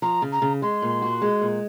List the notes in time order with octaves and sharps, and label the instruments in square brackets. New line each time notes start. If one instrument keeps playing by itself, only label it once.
[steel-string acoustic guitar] F3 [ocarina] A#5
[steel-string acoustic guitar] C#3
[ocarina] A#5
[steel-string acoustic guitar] C#3
[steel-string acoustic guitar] G#3 [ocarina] C6
[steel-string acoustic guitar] A#2
F#4
G#3
A#2